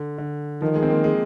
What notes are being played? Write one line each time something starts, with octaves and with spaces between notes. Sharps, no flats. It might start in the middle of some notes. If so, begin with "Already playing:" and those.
Already playing: D3
D3
D#3 F3
G#3
C4
A#3
G#3